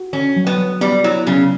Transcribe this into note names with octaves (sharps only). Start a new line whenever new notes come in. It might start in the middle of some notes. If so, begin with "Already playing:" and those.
Already playing: F#4
D3 C#4
F#3
B3
F#3
G3 B3
F#3 E4
C#3 F#3